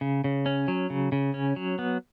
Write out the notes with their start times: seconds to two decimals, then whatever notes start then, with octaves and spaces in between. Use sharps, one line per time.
0.01 C#3
0.24 C#3
0.46 C#4
0.68 F#3
0.90 C#3
1.12 C#3
1.34 C#4
1.56 F#3
1.79 B3